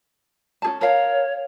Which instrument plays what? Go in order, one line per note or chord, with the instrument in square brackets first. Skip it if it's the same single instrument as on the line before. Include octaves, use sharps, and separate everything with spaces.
[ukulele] C#4 G#4 A5
[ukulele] A#4 F5 [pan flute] C#5